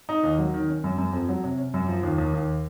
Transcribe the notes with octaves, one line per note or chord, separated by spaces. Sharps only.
D#4
D#2
F#3
D#3
C#4
F#2
F#2
F2
F#3
C3
C#4
F#2
F3
D#2
D#2
D#2